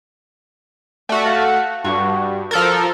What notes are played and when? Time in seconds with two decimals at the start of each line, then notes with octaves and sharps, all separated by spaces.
1.09 A3 F#4 D5
1.26 F5 A5
1.84 G2 F#4 C#6
2.51 F3 A4 A#4